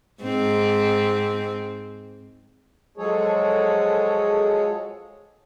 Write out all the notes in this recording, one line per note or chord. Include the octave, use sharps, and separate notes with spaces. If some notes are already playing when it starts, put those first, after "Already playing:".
G#2 C4
F3 F#3 G#3 G#4 A4 C#5